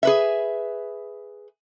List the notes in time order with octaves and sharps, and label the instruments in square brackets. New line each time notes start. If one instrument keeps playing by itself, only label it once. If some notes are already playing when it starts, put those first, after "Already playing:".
[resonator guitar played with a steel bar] G#4 B4 E5